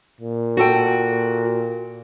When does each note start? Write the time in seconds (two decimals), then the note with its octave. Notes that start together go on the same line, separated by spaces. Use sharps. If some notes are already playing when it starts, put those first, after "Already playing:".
0.20 A#2
0.57 F#4 A4 G5